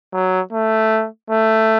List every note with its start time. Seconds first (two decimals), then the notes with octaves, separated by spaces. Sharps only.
0.13 F#3
0.53 A3
1.30 A3